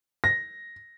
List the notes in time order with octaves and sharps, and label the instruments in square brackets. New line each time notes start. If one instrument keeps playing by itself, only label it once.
[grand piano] A#6